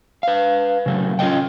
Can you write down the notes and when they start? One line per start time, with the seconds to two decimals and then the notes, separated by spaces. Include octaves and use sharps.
0.23 B4 F5
0.86 C#3 F#3 A3
1.19 C#4 F4 A4 D#5 G5